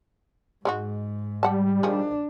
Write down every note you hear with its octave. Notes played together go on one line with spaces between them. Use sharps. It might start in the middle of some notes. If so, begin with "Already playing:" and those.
G#2 G#3 D#4 F#4
G3 G4 F#5 A5
D#3 F3 D4 G#4